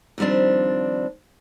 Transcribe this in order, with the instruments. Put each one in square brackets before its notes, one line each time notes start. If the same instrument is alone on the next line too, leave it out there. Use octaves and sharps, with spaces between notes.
[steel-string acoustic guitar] D#2 F3 G3 C4 D4